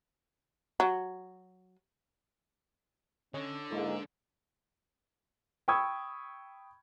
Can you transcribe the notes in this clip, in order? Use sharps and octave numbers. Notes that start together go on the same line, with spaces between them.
F#3
D3 C#4 C#5 D#5 G#5
G#2 G#3 A#3 E4 A4
G5 B5 C#6 D#6 E6 G#6